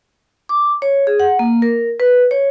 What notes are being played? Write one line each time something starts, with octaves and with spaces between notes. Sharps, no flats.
D6
C#5
G#4
F#5
A#3
A#4
B4
C#5